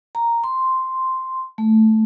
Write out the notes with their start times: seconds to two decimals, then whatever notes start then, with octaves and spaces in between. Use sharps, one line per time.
0.15 A#5
0.44 C6
1.58 A3